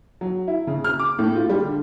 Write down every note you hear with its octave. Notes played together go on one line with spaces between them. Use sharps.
F#3
E4
C#3
F6
D6
A2
F4
G3
D3